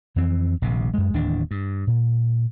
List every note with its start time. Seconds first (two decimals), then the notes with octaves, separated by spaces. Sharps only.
0.16 F2 E3 C4
0.62 D#1 A#1 C3
0.94 F#2 G#3
1.14 D1 D#2 E3 D4
1.51 G2
1.87 A#2